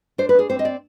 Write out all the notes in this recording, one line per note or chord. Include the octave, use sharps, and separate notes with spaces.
D4 C5
B4
D4 G#4
C4 C5
D#5
D5